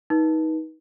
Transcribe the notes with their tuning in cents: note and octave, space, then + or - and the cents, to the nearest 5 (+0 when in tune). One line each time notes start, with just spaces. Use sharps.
D#4 +25 B4 -30